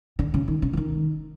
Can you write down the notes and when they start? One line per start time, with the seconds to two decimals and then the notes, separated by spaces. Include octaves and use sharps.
0.19 D3
0.34 C#3
0.48 D#3
0.62 C#3
0.73 E3
0.77 D#3